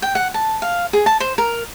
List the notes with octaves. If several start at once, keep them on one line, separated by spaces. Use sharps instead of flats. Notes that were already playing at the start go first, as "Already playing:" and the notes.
G5
F#5
A5
F5
G#4
A5
C5
A#4